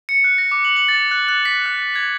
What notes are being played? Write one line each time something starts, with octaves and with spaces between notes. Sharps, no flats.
C#7
F#6
A#6
D6
F#7
F#7
A6
F#6
F#6
B6
F#6
G#6